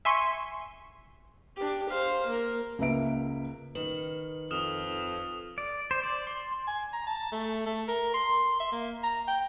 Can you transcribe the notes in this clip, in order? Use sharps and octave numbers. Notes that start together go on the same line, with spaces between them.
E5 G#5 C6 C#6
D4 G4
C5 F5
A#3 A#4
C#2 A#3 B4 E5 D7
D#3 B4 F#7
F2 D#6 F6 E7
D5
C5
D5
C6
G#5
A#5
A5
A3
A3
A#4
C6
E5
A#3
A#5
G5